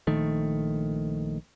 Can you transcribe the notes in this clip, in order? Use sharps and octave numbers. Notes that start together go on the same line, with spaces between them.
A#1 D#3 A3